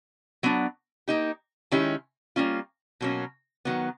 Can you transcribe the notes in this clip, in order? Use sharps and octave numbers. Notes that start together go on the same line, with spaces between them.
F#3 B3 D4
A#3 D#4 G4
D#3 G#3 C#4 E4 G4
G3 A#3 C#4 F4
B2 F#3 A#3 C#4
D#3 F#3 B3